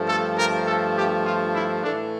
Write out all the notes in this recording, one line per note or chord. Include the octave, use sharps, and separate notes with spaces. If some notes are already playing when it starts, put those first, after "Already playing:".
Already playing: G2 F3 A3
A4
A#4
A4
G4
F4
E4
A2 E3 A3 D4